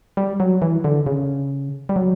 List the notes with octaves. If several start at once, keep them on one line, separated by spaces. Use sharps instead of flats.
G3
F#3
E3
D3
C#3
G3
F#3